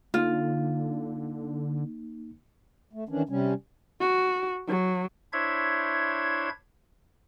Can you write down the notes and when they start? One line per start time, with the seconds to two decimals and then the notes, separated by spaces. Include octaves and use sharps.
0.14 D3 A#3 D#4 F4
2.93 A3
3.09 D#3 E3 C#4 D4
3.29 C3 G3 C#4
4.00 F#4
4.68 F#3
5.33 D4 E4 C5 C#5 E5 G#6